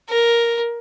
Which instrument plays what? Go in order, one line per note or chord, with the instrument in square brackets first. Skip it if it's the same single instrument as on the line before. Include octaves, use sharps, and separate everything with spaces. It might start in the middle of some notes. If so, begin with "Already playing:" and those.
[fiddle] A#4